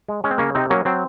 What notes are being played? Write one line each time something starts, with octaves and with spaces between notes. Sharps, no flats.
G#3
G#3 C#4
C4
C#3 A#3 C#4
C3 C4 D#4
F#3 A#3 C#4
F#3 C4